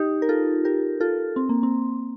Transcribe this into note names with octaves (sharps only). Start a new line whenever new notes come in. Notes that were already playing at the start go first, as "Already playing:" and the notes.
Already playing: D#4 G4
A#4
F4 A4
G4 A#4
F4 A4
C4
A#3
C4